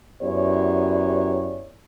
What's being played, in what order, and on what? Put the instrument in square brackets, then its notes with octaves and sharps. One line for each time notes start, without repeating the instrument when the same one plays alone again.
[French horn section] F#2 B3 E4 G4 C#5 D5